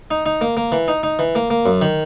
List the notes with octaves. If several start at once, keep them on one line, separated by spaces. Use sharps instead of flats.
D#4
D#4
A#3
A#3
E3
D#4
D#4
E3
A#3
A#3
F#2
D#3